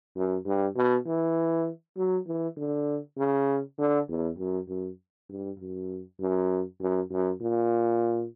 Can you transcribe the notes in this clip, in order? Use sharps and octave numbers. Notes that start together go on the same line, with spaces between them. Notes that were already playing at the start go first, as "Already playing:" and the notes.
F#2
G2
B2
E3
F#3
E3
D3
C#3
D3
E2
F#2
F#2
G2
F#2
F#2
F#2
F#2
A#2